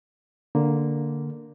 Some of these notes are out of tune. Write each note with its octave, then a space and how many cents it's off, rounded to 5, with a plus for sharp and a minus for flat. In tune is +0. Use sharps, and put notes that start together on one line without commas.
D3 +0 A#3 +0